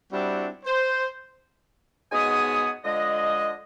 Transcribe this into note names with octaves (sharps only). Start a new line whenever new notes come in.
G3 C4 D4 E4 F#4
C5
G#2 B2 B3 C#5 G#5 D#6
D3 F3 G#3 D#5